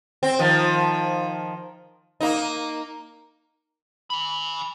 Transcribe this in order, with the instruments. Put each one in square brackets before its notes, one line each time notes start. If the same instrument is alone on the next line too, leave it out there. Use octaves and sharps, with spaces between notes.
[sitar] C4
D#3 F3
A#3 D#4
[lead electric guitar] G#5 B5